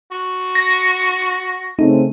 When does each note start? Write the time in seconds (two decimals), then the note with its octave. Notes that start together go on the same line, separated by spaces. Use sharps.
0.11 F#4
0.55 A#6
1.79 C#3 A3 C4 D#4